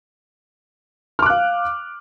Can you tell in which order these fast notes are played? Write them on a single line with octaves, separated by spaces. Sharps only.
F6 D6 F#6 F5